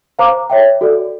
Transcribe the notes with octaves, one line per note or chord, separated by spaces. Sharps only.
C5 F5 A#5 D6
C#5 E5 G5
F#4 A4 D5